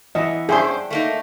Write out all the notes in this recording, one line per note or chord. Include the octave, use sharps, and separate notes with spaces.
E3 B3 D#5 E5
G2 C#4 D4 G#4 C5 E5 G5 C6
A3 A#3 D#4